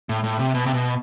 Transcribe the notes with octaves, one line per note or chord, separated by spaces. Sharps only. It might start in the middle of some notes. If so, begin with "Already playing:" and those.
A2
A2
C3
B2
C3
B2